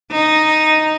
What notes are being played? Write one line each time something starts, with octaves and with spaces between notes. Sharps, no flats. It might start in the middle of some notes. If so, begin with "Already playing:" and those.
D#4